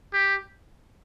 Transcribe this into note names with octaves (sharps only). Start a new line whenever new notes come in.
G4